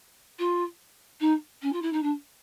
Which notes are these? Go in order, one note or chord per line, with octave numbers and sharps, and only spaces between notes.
F4
D#4
C#4
F4
E4
D#4
D4